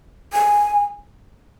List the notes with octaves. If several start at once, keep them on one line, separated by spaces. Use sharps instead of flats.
G#5